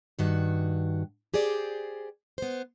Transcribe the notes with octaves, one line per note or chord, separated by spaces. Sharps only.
G2 D#3 F#4
G4 G#4 C5 D5
B3 C5